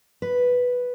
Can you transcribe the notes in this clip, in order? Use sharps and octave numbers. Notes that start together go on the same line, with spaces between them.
B4